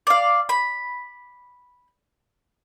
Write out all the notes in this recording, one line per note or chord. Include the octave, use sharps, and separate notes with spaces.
D5 F5
B5